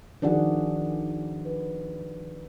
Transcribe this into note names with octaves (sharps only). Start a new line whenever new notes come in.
D#3 F3 D4 F#4 G#4 F#5
B4